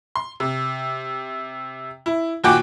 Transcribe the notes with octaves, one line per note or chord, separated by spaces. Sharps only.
C6
C3
E4
D#2 A#2 F#4 G5 G#5 D6